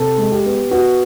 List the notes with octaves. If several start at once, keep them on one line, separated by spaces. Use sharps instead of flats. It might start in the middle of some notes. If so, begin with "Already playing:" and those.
Already playing: C3 A4
G#3
G4
B3
B3 F#4